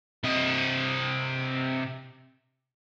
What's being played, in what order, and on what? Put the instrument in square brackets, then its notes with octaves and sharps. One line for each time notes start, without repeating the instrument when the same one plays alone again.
[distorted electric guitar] C3 D#5